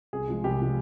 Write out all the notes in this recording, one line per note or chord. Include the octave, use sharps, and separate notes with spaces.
C2 G#4
C3 F3 G#3
C2 G4
C3 F3 G#3